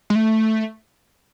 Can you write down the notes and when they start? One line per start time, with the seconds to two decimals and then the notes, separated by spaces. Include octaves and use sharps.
0.10 G#3
0.15 A3